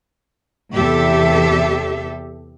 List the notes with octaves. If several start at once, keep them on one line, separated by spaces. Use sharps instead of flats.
E2 C3 G4 A4 E5